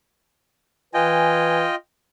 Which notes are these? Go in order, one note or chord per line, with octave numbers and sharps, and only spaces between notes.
E3 F4 B4 D#5 G5 G#5